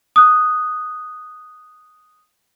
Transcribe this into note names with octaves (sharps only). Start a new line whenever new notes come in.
D#6 F#6